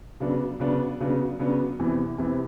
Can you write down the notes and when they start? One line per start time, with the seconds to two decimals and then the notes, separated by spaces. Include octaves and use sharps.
0.20 C#3 F#3 B3 D4
0.60 C#3 F#3 B3 D4
1.00 C#3 F#3 B3 D4
1.39 C#3 F#3 B3 D4
1.79 E2 C3 E3
2.18 E2 C3 E3